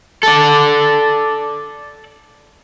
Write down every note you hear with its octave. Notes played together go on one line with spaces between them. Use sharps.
A4 D5